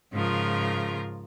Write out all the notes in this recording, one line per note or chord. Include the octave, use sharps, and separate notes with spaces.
G#2 C#3 F3 F4 A#4